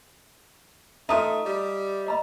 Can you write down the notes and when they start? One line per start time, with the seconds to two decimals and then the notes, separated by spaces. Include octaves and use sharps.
1.09 A3 D#4 F4 E5 D#6
1.46 G3
2.07 D#5 A#5 B5